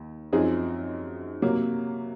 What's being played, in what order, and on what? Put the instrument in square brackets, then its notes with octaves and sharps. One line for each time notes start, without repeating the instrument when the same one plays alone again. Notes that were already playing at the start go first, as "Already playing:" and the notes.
Already playing: [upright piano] D#2
F#2 F3 C4 D#4 G#4
C3 F#3 A#3